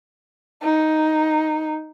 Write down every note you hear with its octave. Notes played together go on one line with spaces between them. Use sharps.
D#4